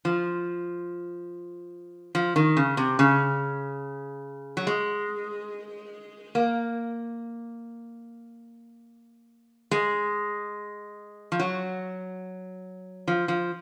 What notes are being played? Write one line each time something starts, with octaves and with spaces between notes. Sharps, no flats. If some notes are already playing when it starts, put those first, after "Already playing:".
F3
F3
D#3
C#3
C3
C#3
F#3
G#3
A#3
G#3
F3
F#3
F3
F3